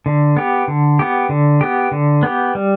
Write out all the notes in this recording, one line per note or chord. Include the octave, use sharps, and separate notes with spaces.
D3
B3 G4
D3
B3 G4
D3
B3 G4
D3
B3 G4
G3